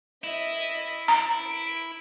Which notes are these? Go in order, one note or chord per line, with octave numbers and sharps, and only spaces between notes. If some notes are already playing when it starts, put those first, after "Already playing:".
E4 D#5 E5
A#5 D7